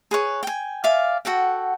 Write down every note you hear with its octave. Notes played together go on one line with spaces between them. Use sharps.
G#4 B4 C#5
G5 G#5
D5 E5 F5 G#5
F#4 A4 F#5 G5